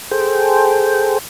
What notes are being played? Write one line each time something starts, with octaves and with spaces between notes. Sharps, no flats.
G#4 A4 C5 G5